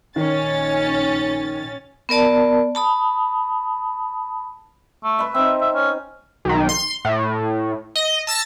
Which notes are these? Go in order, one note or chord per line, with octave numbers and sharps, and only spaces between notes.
A#1 D#3 C#4 A6
B3 A#4 D5 A5
A5 B5 D#6
A3
B4 E5
C4 D#4 E5
E5
C#4
B1 D#3
C6
A2
D#5
A5 E6 A6 A#6